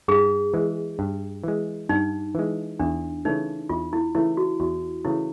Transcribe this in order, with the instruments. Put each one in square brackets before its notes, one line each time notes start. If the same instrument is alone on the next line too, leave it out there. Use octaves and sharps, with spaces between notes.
[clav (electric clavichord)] G2 [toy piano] G#4
[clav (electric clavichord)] E3 G#3
G2
E3 G#3
[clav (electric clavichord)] G2 [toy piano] D#4
[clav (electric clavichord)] E3 G#3
[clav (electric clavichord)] E2 [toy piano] D4
[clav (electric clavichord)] C#3 E3 A3 [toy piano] D#4
[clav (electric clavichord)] E2 [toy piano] F4
[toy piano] E4
[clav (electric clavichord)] C#3 E3 A3 [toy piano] E4
[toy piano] F#4
[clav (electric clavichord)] E2 [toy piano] F#4
[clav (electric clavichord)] C#3 E3 A3 [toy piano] E4